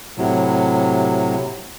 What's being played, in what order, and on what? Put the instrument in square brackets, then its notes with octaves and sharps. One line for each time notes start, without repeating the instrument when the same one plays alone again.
[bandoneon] A2 C3 F#3